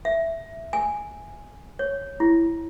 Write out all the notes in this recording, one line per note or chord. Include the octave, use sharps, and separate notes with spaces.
E5
G#5
C#5
E4